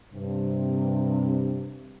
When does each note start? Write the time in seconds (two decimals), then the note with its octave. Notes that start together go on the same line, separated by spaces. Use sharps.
0.13 G2 C3